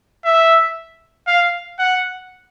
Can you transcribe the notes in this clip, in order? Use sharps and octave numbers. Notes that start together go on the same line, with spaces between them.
E5
F5
F#5